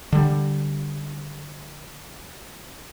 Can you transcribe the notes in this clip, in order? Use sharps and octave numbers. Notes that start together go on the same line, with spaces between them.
D3 G3